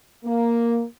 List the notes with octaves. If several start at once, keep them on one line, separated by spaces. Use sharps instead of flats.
A#3